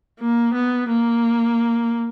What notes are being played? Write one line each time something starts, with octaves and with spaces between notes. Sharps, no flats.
A#3
B3
A#3